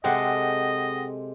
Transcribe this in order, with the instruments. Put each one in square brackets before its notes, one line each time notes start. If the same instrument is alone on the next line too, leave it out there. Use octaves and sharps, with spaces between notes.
[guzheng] C3 G#3 A4 [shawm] D#5 [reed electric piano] F#5 G5